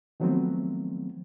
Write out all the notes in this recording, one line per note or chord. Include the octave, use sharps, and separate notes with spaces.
D#3 F3 F#3 A3 B3 C4